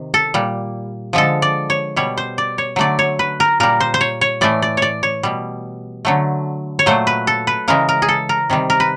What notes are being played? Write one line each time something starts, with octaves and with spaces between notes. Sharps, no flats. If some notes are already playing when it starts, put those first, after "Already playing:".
Already playing: C3 D#3
A4
A#2 G3
D3 F3 G#3 A4
D5
C#5
B2 G3 C#5
C5
D5
C#5
D3 F#3 A3 D5
C#5
B4
A#4
A#2 G3 A#4
C5
C5
C#5
C#5
A2 E3 A3 D5
D5
C#5 D5
C#5
B2 G3
D3 F#3 A3
C#5
A#2 F#3 A3 C5
B4
A4
B4
C#3 E3 G#3 A#4
A#4
G#4
A4
A#4
C3 D#3 G3
A#4
B4